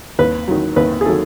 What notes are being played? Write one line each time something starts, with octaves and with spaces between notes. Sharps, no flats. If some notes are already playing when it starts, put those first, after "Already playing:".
D#2 B4
D#3 F#3
D#2 B4
G#4
D#3 F#3 A4